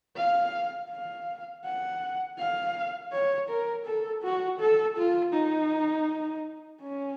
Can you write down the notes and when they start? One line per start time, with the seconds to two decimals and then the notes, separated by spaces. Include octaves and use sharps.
0.17 F5
0.91 F5
1.64 F#5
2.38 F5
3.13 C#5
3.49 A#4
3.86 A4
4.23 F#4
4.60 A4
4.97 F4
5.33 D#4
6.82 C#4